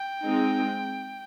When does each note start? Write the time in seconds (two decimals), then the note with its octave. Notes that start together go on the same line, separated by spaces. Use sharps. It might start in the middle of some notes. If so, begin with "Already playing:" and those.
Already playing: G5
0.24 G#3 C4 D#4